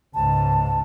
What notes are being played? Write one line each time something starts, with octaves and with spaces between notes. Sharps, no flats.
C#2 G#2 A5